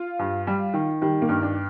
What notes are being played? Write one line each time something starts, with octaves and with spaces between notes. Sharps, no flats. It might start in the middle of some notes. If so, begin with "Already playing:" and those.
Already playing: F4
G2
G3
D#3
D#3 G3
A#3
G2
D4